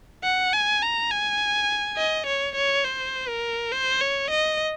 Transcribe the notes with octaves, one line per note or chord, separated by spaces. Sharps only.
F#5
G#5
A#5
G#5
D#5
C#5
C#5
C5
A#4
C5
C#5
D#5